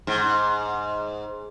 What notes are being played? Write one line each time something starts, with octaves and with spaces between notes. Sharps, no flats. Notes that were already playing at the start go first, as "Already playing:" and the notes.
G#2